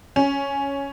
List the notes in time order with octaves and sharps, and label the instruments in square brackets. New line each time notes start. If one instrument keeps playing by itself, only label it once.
[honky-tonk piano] C#4